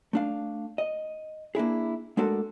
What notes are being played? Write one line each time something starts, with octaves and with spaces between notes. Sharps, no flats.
A3 D4 F5
D#5
A#3 D4 E4 G#4
G#3 A3 D4 F#4 A4 A#4